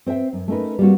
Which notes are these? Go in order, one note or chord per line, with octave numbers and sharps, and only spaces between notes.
C4 C5 E5 G5
F#2
A3 C#4 D#4 A#4 B4
G3 A#3 C4 F#4